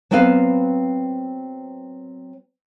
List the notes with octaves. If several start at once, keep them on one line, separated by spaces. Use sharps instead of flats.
F#3 B3 C4 B4 F5